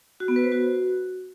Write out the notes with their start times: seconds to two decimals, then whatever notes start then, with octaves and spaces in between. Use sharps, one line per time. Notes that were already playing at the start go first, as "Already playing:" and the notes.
0.20 F#4
0.28 B3
0.36 B4
0.44 C5
0.52 F#4